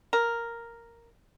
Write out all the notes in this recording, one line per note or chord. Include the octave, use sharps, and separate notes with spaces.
A#4